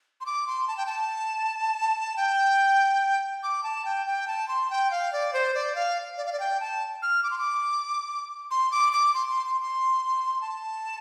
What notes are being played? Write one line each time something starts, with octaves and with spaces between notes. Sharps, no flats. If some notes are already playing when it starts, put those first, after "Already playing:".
C6
D6
C6
A5
G5
A5
G5
D6
A5
G5
G5
A5
C6
G5
F5
D5
C5
D5
F5
D5
F5
D5
G5
A5
F6
D6
C6
D6
C6
D6
D6
C6
C6
C6
C6
A5